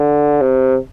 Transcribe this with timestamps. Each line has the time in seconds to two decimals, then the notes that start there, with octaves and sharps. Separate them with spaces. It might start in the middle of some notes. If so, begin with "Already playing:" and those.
Already playing: D3
0.41 C3